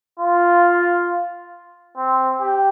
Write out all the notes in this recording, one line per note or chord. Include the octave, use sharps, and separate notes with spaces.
F4
C4
G4